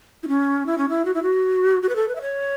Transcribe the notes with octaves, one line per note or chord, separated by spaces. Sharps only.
E4
C#4
E4
C#4
E4
F#4
E4
F#4
F#4
B4
A4
B4
E5
C#5